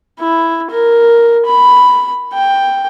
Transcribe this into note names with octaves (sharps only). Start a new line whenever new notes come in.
E4
A#4
B5
G5